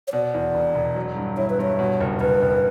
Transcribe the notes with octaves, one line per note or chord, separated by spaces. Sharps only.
C#5
B2 D5
E2
E1
E1
F#3
G2
E4 C#5
B4
G2 C#5
B2
F#1
F#1 B4
F#1